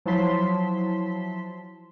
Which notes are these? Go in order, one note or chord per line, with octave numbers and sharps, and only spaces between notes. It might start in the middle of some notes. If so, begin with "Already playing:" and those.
F3 F#3 E4 A5 C6 B6